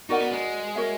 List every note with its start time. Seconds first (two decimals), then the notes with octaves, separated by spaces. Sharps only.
0.09 D#4 F#4 A#4 D5 F#5
0.21 B3
0.31 G#3
0.75 F#4 A#4 C#5 E5